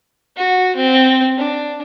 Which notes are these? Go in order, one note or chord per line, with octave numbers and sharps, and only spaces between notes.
F#4
C4
D4